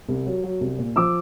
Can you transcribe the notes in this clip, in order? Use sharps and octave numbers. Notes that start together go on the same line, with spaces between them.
C2
F#3
F#3
C2
A#2
F3 D6 E6